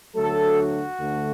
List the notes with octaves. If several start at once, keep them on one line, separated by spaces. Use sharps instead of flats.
D2 D3 F#3 A3 A4
F#4
D2 D3 A3